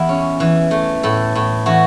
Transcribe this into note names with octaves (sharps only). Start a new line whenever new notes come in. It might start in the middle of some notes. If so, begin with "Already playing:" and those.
Already playing: E2 E4
C#4
E3
A3
A2 A4
A2
E3 F#4